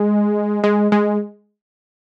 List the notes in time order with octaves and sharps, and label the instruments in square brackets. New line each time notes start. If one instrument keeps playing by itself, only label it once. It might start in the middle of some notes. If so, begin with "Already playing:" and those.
Already playing: [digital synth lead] G#3
G#3
G#3